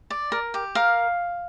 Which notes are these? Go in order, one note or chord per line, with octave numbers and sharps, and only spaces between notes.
D5
A#4
G4
A#4 F5